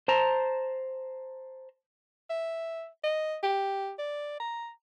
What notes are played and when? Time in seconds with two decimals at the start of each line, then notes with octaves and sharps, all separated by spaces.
0.08 C5 A5 A#5
2.30 E5
3.04 D#5
3.43 G4
3.99 D5
4.40 A#5